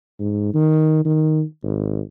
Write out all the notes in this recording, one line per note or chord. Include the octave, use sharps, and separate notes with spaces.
G#2
D#3
D#3
G#1